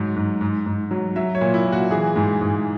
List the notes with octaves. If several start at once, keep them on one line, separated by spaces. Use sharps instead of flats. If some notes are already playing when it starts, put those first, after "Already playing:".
Already playing: G#2 F#3
G#2
G#2
G#2
F#3
F#3 E5
C#5
A#2
E4
A#2
F#4
E3 G#4
G#2
G#2